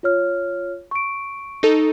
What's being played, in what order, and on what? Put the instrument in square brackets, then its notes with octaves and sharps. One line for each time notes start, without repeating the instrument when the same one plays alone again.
[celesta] F4 C#5 F6
C#6 D7
[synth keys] D#4 A4